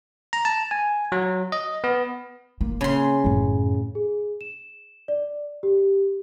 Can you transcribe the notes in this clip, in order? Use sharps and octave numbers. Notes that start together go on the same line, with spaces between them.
A#5
A5
G#5
F#3
D#5
B3
A#3
C#3 C6
F#2 A2
G#4
E7
D5
G4